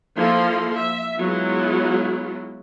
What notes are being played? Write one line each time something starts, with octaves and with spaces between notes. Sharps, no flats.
F3 A#3 E4 A4 C6
E5
F#3 G#3 B3 E4 F4